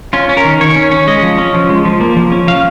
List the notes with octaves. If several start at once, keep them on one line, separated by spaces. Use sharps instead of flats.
C#4 F4
C#4
A#4
D#3
D#3 C#5
C#4
C#4
G#3 D#5
F3
C#4
F3
G#3
F3
A#3
F3
C#4
F3 F5